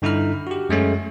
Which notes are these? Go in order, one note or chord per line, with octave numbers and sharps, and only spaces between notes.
G2 D3 D#4 E4 B5 F6
F#4 G4
F#2 G#3 A3 C#4